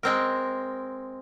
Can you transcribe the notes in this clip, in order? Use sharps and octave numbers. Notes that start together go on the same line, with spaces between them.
G#3 C4 A#4